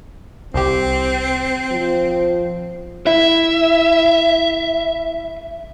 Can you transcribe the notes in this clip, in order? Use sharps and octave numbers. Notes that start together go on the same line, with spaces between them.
C2 C4 G4
F3
E4 E5